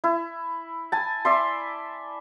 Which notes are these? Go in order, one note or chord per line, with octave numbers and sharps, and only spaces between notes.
E4
G#5 A5
D5 E5 C6